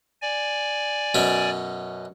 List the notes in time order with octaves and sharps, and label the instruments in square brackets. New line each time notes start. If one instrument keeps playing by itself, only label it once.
[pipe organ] D5 G#5
[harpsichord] F#2 B2 C#4